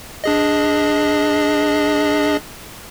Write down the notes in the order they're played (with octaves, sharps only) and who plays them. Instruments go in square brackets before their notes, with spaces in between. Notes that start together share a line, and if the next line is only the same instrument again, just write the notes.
[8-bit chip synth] D4 G#4 D#5